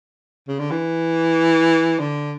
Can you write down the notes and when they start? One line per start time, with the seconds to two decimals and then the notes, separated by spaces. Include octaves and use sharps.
0.48 C#3
0.59 D3
0.71 E3
1.99 D3